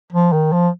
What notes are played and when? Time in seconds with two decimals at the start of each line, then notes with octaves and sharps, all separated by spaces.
0.12 F3
0.32 D#3
0.52 F3